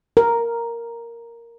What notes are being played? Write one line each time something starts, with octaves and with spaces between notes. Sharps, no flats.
A#4